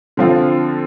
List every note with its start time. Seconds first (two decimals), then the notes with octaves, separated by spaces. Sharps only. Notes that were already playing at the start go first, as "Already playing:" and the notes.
0.17 D3 F3 C4 F4